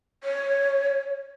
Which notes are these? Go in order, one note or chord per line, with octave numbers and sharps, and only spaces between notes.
C#5